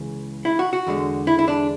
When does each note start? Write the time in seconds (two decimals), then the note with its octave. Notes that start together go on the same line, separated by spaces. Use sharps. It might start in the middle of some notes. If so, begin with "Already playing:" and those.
Already playing: C#2 C#3 E3
0.45 E4
0.59 F#4
0.73 F#4
0.87 E2 D3 G#3
1.27 E4
1.39 E4
1.48 D4